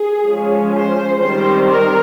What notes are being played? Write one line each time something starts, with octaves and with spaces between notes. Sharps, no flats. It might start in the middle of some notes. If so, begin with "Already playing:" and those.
Already playing: G#4
F3 G#3 C#4
C5
D#3 G3 C4 C5
A#4